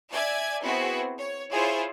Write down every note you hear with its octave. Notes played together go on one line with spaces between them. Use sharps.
D5 E5 G#5 G#6
B3 C4 E4 F#4 G#4
C#5
E4 F4 G#4 C5 C#5